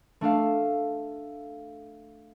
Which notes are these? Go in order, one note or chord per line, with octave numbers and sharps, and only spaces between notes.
A3 D4 A4 F5